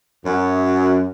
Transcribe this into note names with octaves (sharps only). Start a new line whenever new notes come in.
F#2